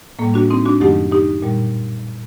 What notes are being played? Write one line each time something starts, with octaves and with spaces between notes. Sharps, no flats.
A2 G3 A#3
D4 F#4
C4 D#4
D4 F#4
F#2 D#3 F#3 A3 D#4 G4
D#4 G4
A#2 G3